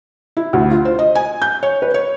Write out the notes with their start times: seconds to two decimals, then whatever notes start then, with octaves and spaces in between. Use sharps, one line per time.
0.37 E4
0.53 D2
0.71 F4
0.85 C5
0.99 D#5
1.15 G#5
1.42 G6
1.63 C#5
1.82 B4
1.94 C#5